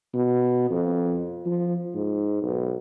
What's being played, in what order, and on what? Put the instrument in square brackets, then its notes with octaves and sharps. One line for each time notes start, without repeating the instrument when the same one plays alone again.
[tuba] B2
F2
F3
G#2
B1